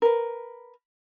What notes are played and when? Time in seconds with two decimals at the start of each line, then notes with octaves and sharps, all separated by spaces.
0.02 A#4 B4